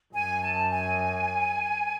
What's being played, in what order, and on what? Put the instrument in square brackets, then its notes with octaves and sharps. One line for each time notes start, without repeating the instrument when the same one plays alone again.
[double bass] F#2 [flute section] G#5
[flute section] A5
G#5